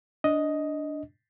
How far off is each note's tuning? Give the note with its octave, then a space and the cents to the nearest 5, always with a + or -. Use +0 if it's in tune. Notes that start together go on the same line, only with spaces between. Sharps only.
D4 -5 D#5 +5